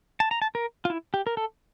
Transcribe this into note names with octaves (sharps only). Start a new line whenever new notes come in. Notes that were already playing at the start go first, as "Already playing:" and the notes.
A5
A#5
A5
A#4
F4
E4
G4
A#4
A4